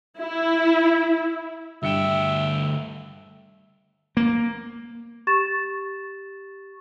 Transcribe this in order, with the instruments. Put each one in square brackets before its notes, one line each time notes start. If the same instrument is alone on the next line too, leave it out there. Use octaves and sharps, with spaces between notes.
[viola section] E4
[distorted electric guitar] D2 G5 [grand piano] G2 C#7 E7 [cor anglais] E5
[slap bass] A#3
[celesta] G4 C#6 A6 E7